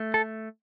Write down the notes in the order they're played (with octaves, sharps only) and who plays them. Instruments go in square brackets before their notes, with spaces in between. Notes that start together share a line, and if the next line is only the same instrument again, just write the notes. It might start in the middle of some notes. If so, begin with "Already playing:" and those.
Already playing: [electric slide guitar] A3
A4